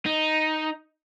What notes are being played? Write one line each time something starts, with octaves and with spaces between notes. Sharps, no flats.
D#4